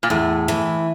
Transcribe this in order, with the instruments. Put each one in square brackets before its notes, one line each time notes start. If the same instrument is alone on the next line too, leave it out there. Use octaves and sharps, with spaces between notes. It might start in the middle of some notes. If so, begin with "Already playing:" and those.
[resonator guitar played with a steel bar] A#2
[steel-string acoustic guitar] E2 [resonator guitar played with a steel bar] A2
[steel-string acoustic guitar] E3